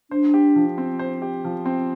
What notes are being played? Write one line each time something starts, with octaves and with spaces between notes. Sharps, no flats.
D4 C5
G4
F3
C4
C5
G4
F3
C4